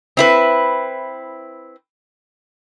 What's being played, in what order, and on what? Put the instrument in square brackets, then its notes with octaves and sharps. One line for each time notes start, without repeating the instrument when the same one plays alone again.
[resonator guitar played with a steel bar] C4 E4 B4